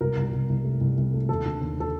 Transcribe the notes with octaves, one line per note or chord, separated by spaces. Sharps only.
C2 A#4
C2
C2
C2
A3
C2
C2
A3
D#2 A4
D3
D#2
A4